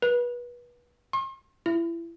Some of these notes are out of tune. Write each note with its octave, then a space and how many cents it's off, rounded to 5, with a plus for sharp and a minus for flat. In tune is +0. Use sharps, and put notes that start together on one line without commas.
B4 -30
C6 +45
E4 +30